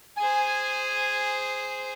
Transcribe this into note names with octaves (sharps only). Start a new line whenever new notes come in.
G#4 C5 G#5